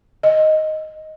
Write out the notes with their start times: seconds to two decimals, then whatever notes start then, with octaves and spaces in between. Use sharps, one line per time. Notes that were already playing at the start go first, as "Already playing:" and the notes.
0.23 D#5